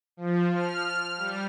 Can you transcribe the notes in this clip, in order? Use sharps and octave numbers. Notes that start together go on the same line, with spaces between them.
F3
F6
G3